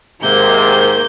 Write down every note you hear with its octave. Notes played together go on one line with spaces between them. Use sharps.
G#2 C3 D#3 A#3 G6